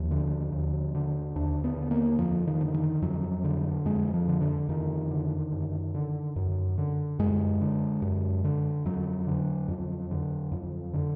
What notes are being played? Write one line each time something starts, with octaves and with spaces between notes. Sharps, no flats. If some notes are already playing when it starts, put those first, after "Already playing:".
Already playing: D#2 F3
D3
D#2
D3
D#2 D4
B3
D3
A#3
F2 F3
D#3
D3
D#3
F2 F#3
D3
F2 G#3
F3
D3
D3
F2 D#3
D3
F#2
D3
F#2
D3
F#2 G#3
D3
F#2
D3
F2 F#3
D3
F2
D3
F2
D3